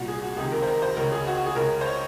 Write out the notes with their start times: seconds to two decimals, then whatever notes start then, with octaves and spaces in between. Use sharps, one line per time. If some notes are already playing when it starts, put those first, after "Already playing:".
Already playing: C2 A#2 F#4
0.08 G#4
0.22 F#4
0.37 C#2 G#4
0.40 C3 D#3
0.52 A#4
0.62 C5
0.67 A#4
0.82 C5
0.96 C#2 C#3 A#4
1.12 G#4
1.27 F#4
1.37 F#4
1.46 G#4
1.56 C#2 C#3 A#4
1.81 C5
1.86 C#5